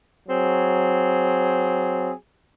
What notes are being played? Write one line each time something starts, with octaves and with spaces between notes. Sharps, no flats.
F#3 C4 G#4